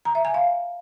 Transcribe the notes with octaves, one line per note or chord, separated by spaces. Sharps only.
A#5
E5
G#5
F5